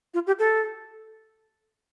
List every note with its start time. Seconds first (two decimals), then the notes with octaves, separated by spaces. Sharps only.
0.14 F4
0.27 G4
0.39 A4